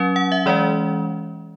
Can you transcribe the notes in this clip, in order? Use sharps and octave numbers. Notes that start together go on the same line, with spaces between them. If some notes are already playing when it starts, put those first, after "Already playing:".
Already playing: F#3 C#4
F#5
E5
E3 G#3 C#4 D5